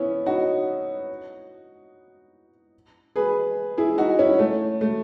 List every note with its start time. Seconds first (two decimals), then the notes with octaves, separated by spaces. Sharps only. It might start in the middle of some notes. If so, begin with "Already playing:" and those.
Already playing: B3 C#4 E4
0.26 D#4 F#4
3.16 G#4 B4
3.78 E4 G#4
3.98 D#4 F#4
4.19 C#4 E4
4.39 A3
4.81 A3